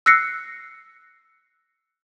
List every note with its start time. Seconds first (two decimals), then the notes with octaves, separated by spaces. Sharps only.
0.06 E6 F#6 A#6 C7 C#7